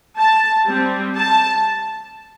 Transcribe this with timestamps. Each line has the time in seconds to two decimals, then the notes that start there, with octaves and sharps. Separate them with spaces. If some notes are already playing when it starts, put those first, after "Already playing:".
0.18 A5
0.67 G3 C4
1.16 A5